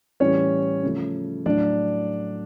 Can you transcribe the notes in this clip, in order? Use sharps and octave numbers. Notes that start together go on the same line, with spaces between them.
A2 E3 G3 C#4 C#5
C#3 F3 A3
A2 F#3 A3 D4 D5